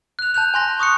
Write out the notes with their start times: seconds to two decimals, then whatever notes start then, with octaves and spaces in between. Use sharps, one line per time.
0.19 F#6 F7
0.34 A5 F#6 G6 F7
0.54 G#5 C6 A#6
0.79 C#6 D#6 F#6 C#7